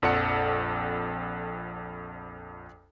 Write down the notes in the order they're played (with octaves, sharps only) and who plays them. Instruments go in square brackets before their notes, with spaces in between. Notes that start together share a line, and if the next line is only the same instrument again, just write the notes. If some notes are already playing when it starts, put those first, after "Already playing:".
[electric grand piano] A#1 F2 A4 D5 F#5 C#7